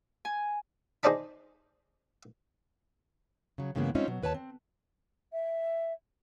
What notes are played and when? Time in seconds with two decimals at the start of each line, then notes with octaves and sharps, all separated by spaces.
0.25 G#5
1.03 D#4 G#4 C5 D5 A5 B5
3.58 C#3 F#3
3.75 G2 C#3 E3 G#3 A#3 B3
3.95 G#3 C4 C#4 D#4 F4 E5
4.07 B2 F#3
4.23 D#2 B4 C#5 G#5 A5
4.34 C4
5.32 E5